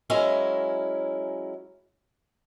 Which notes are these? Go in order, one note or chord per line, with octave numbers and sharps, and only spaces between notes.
F#3 G#3 C#4 E4 A#4